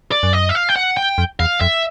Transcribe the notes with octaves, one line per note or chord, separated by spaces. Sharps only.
D5
F#2
D#5
E5
F5
G5
F#5
G5
F2
E2 F5
F2 E5